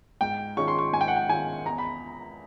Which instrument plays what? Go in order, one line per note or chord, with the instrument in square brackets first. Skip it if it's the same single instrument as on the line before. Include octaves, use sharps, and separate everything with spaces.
[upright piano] G#2 [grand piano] G5
[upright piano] D#3 G#3 C#4 F4 [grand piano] C#6
[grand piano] C6
C#6
[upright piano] G#2 [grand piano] G#5
[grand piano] G5
F#5
G5
[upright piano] D#3 G#3 C#4 F4 [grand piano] G#5
[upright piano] E2 [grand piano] A#5
[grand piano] B5